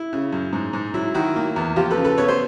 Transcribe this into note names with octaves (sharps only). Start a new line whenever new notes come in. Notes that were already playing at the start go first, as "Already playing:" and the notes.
Already playing: E4
C#3
F#2
G#2
G#2
F#3 E4
D#3 E4 F#4
A#3
E2
F3 F4 G4
A4 B4
C#3
A4 B4
B3 B4 C#5
C5